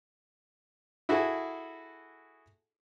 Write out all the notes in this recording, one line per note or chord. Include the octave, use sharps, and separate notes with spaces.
E4 F#4 G#4 A4 E5 F#5